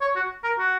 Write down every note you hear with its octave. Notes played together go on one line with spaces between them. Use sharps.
C#5
F#4
A#4
F#4